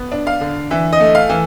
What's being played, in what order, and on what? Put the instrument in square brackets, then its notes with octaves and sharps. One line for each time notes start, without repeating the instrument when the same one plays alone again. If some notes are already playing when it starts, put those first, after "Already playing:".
Already playing: [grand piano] B3
D4
F5
D3
E3 E5
D#5
A3
F5
E3